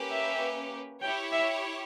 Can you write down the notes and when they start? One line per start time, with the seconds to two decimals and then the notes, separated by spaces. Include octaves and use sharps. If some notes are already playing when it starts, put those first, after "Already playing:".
Already playing: A#3 C#4 G4 B4
0.11 E5
1.02 E4 G4 C#5 G5
1.33 E5